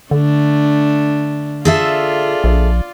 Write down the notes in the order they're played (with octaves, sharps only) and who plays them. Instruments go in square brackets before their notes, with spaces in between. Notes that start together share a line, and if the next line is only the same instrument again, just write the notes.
[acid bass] D3 [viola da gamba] A3 D4
[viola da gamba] F4 D5 [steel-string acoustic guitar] G#4 A4 E5
[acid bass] A#1